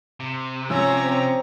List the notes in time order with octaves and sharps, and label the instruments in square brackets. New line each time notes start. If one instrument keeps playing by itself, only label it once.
[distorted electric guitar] C3
[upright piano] F3 C#4 E6 [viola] C#5 A#5
[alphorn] C4